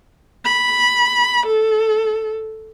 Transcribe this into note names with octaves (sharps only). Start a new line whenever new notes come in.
B5
A4